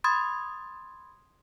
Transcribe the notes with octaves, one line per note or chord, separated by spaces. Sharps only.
B5 C6 D#6 G#6 A6